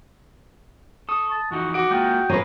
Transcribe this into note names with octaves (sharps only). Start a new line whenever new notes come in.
A4 C#6 D#6
A5
F2 E3 D#4 F#4
F#4 D6 D7
G#3 A#3 F4 G5
B1 B4 C#5 F5 G#5 A#5